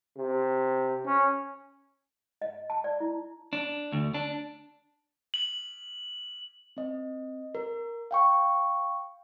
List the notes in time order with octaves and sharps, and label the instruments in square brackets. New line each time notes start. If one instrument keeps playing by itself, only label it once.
[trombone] C3
C#4
[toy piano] D#5
A5
D5
E4
[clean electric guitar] D4
D2
D4
[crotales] F#7
[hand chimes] C4 D#5
A#4
F5 G5 C#6